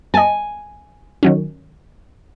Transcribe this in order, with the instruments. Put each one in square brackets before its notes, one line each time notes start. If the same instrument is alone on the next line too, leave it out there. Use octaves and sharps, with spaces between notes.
[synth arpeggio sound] D#5 A5 [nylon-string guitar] G#5
[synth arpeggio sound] D#3 F#3 C#4